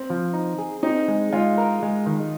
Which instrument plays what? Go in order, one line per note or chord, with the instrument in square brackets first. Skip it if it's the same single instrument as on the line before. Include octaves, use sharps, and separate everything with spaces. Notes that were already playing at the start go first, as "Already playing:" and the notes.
Already playing: [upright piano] C4
[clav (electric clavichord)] F3
D#4
G#4
[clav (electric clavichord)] C4 [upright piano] D#4
[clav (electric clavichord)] G#3
[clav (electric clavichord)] G#3 [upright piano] F4
[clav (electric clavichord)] A#4
G#3
D#3